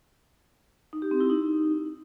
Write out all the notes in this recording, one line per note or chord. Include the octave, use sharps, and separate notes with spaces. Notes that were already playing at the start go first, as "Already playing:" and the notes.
D#4
G4
C4
E4
D#4